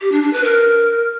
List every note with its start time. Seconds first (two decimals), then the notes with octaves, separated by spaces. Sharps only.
0.01 G4
0.12 D4
0.22 D4
0.33 B4
0.44 A#4